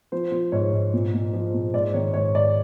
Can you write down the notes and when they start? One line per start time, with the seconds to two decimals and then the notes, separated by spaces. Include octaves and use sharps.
0.12 F3 C5
0.32 F3
0.52 G#2 C#5
0.72 G#2
0.94 A#2
1.14 A#2
1.33 F3
1.54 A#2
1.74 G#2 D5
1.94 D#3 C#5
2.14 G#2 C#5
2.34 G#2 D5